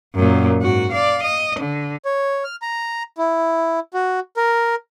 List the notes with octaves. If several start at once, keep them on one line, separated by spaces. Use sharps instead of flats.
F#2 A#2
G#2 F#4
D5 F5
D#5
D3
C#5
F6
A#5
E4
F#4
A#4